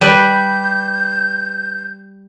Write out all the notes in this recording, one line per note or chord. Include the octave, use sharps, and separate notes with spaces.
G3 B4 G6